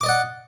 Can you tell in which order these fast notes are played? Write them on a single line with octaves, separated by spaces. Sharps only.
D6 D#5 D5 F#5